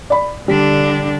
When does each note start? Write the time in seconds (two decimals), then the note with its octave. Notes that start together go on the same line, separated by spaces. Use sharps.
0.10 D5 B5
0.48 D3 G3 D4